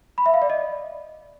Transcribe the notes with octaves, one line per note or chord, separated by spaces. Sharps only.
B5
E5
F5
D5
D#5